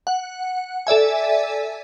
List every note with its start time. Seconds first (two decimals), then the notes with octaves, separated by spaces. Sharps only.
0.07 F#5
0.87 A4 D5 E5 G#5